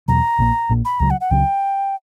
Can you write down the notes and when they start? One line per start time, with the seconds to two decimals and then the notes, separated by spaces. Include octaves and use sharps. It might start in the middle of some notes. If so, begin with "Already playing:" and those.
0.08 E2 B2 F#3 A#5
0.39 A#1 A#2 A#3
0.69 A#1 A#2 A#3
0.85 B5
1.00 C#2 C#3 F#3 A#5
1.10 F#5
1.21 F#5
1.31 C#2 C#3 F#3 G5